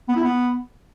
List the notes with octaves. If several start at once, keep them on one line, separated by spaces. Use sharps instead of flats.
B3
E4
B3